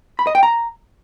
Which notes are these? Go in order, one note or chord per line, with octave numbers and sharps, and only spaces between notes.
B5
D#5
G5
A#5